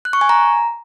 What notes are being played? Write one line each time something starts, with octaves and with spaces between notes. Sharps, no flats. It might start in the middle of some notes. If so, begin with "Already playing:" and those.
F#6
C#6
G#5
A#5